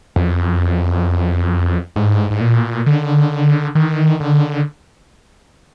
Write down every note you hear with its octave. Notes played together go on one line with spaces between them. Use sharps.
F2
G#2
G#2
A#2
D3
D#3
D3